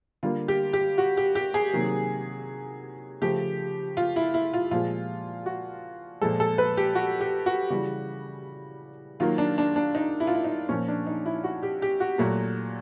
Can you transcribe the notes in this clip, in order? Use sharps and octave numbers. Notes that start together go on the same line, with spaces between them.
D3 G3 A#3 F4
G4
G4
F#4
G4
G4
G#4
C3 D#3 F#3 A#3
C#3 F3 A3 G4
F4
E4
E4
F4
A#2 F3 G#3 F4
F#4
A#2 F3 G#3 A4
A4
B4
G4
F#4
G4
F#4
C#3 E3 G3 F#4
D#3 F#3 A#3 F4
D4
D4
D4
D#4
E4
F4
E4
D#4
A#2 F3 A#3 C#4
D4
D#4
E4
F#4
G4
G4
F#4
A#2 F#3 A3